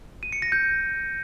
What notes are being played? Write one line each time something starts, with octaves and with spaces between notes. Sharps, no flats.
D#7
C#7
A#6
G6